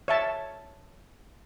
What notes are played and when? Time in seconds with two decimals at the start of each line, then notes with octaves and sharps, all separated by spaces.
0.08 C#5 E5 A5